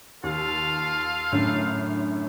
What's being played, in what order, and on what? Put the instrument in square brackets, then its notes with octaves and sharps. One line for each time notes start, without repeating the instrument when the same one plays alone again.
[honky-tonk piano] D#2 [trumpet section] F4 A4 F5
[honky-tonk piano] F#2 A2 D3